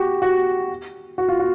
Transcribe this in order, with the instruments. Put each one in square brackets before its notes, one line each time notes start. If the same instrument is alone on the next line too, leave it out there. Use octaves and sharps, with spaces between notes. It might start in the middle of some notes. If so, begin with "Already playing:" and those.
Already playing: [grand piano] F#4 G4
F#4
F#4
F4
F#4